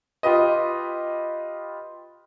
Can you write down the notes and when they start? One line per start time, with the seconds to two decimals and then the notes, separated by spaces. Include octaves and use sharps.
0.23 F4 G4 B4 D#5